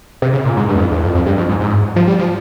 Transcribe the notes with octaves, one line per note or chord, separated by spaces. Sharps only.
C3
C#3
A#2
G#2
G2
E2
F2
E2
F2
F2
G2
F2
G#2
G#2
F3
G3
F3